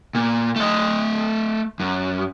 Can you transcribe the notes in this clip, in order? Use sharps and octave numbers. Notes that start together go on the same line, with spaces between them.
A#2
A3 D#5
F#2